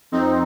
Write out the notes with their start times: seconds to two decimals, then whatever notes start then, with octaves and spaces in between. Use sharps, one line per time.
0.12 F2 C4 D#4